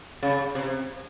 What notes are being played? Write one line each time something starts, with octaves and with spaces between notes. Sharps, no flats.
C#3
C3